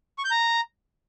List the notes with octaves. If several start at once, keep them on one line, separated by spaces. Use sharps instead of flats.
C#6
G6
A#5